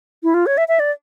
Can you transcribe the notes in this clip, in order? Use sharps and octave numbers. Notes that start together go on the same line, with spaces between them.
E4
F4
C#5
E5
E5
D5